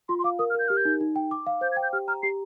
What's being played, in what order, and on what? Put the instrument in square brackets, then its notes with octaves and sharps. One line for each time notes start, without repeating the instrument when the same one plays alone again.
[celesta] F4 [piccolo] C6
[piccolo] C6
[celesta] F5 [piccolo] D6
[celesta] A#4 [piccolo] D#6
[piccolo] F6
[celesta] A#4 [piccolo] G6
[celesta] G4 [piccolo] F6
[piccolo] G6
[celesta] D#4
D#4
G5
D6
F5
[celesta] C5 [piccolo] G6
[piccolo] G#6
[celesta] G5
[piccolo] G6
[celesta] G4 [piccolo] F6
[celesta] A#5 [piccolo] F6
[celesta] G4 [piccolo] C7